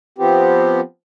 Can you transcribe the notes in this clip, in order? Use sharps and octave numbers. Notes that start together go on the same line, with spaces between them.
F3 B3 C4 G4